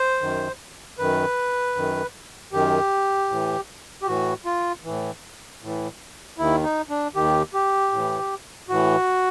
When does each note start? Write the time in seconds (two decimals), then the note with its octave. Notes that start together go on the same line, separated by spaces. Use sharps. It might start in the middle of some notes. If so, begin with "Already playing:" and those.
Already playing: C5
0.21 F#2 D#3
0.98 F#2 D#3 B4
1.76 F#2 D#3
2.53 F#2 D#3 G4
3.30 A2 E3
4.02 G4
4.07 A2 E3 F#4
4.45 F4
4.84 A2 E3
5.62 A2 E3
6.38 D#2 D#3 E4
6.64 D#4
6.90 D4
7.15 D#2 D#3 G4
7.54 G4
7.92 A2 E3
8.69 A2 E3 F#4